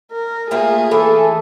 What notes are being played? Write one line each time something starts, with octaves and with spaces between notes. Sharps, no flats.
A#4
A3 A#3 F4 G#4
E3 A3 A4